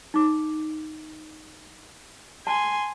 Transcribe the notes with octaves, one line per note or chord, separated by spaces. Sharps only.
D#4 D6
G#5 A5 C6